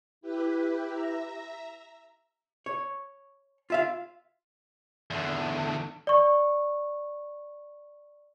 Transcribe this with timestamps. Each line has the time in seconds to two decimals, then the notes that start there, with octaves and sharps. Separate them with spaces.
0.21 E4 G4 B4
0.87 E5 A#5
2.66 C#5
3.70 F4 E5 F5
5.10 E2 D3
6.07 D5 C#6